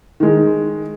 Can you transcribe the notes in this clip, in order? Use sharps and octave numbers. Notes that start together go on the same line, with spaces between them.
D#3 G#3